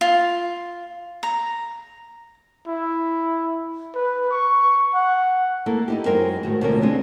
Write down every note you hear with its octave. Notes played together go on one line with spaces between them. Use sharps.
F4
A#5
E4
B4
C#6
F#5
A#3 E4 A4
D#4 E4 G4
F#2 G#3 A#4 C5 G5
A2 D#3 F#4
D2 B2 F3 A#3 C#4 A#4
G#3 C4 D4 E4